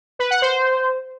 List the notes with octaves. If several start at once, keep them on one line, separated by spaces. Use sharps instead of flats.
B4
F#5
C5